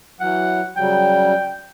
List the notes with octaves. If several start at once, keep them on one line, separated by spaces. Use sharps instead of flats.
E3 F#3 F#5
C#3 F#3 G3 G5